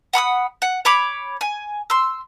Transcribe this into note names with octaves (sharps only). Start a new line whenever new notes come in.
F#5 B5 D6 D#6
F#5
C#5 B5 D6
G#5
C6 E6